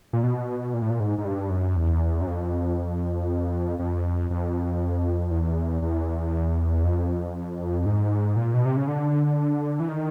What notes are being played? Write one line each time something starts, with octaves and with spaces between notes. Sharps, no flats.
A#2
B2
A#2
A2
A#2
G#2
G#2
G2
F#2
E2
F#2
F2
F2
F2
E2
E2
F2
G#2
A#2
B2
C3
C#3
D3
E3
D#3